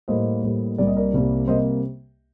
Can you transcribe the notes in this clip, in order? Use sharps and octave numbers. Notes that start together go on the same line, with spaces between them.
A2 G3 A#3 C5 D#5
A2 G3 A#3
C2 C3 G3 A#3 D5
D#5
A#4 D5
C2 C3 G3 A#3
C3 G3 A#3 C5 D#5